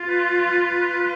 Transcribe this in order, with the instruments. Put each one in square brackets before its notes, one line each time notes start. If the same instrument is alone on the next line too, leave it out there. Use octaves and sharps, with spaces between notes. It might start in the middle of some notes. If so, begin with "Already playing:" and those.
Already playing: [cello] F4
[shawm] B4